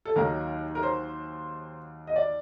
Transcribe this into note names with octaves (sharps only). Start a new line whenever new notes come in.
A4
D#2 D#3 F#3 A#4
A#4
C5
D#5
D5